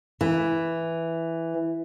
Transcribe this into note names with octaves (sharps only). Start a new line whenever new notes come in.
E3